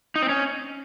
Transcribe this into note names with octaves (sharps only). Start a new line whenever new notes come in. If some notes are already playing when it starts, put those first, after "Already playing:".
D#4
C4
C#4